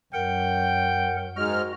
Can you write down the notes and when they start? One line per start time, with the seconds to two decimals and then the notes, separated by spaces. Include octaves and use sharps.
0.14 F#2 A#4 F#5 G5
1.37 G#2 G#3 F#4 D#5 F6